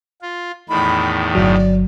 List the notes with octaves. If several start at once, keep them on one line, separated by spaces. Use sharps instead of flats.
F4
E2 A2 D#3 B5
G1 F#3 D5